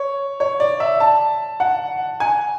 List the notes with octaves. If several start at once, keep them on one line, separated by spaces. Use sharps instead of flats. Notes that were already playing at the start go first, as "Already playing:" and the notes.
Already playing: C#5
C#5
D5
E5
A5
F#5
G#5